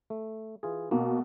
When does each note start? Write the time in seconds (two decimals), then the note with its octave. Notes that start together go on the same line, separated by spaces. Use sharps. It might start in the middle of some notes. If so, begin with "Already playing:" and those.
0.10 A3
0.63 E3 F4 G#4
0.91 B2 A#3